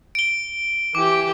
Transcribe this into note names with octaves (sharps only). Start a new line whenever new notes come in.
D7 G7
E3 G4 D6